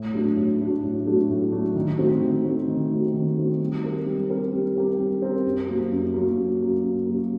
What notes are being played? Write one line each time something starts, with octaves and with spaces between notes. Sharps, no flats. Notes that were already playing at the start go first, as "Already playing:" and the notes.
Already playing: A2
F#3 A3 D4 F#4
A2
F#3 A3 D4 F#4
A2
F#3 A3 D4 F#4
A2
F#3 A3 D4 F#4
D#3
A3 C4 F#4
D#3
A3 C4 F#4
D#3
A3 C4 F#4
D#3
A3 C4 F#4
G3
C4 G4 A#4
G3
C4 G4 A#4
G3
C4 G4 A#4
G3
C4 G4 A#4
F#2
F#3 A#3
F#2
F#3 A#3
F#2
F#3 A#3
F#2
F#3 A#3